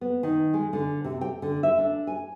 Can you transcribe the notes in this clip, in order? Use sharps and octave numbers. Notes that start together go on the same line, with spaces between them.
B3
D#3
G#3
D3
C3
G5
D3
E5
D4
G#5